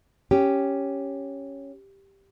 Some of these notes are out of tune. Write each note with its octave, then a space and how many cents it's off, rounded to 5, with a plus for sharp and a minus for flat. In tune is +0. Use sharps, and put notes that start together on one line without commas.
C#4 +0 G4 +0